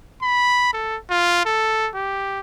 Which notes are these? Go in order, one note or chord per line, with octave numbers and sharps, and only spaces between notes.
B5
A4
F4
A4
G4